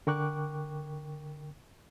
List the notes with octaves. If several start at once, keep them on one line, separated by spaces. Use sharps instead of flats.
D3 A#4 G5 C#6 D6 F#6